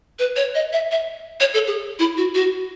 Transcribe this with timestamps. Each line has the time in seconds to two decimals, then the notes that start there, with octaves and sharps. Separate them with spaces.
0.19 B4
0.36 C#5
0.55 D#5
0.73 E5
0.91 E5
1.40 C#5
1.54 A4
1.67 G#4
1.99 E4
2.17 F#4
2.35 F#4